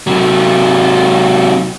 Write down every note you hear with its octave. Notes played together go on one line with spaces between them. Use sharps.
C3 F#3